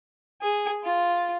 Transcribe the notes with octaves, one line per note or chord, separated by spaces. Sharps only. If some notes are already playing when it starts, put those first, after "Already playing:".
G#4
F4